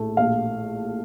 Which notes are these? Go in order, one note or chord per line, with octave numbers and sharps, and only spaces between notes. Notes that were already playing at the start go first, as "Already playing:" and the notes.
Already playing: A#1 A2 A3
A#1 F5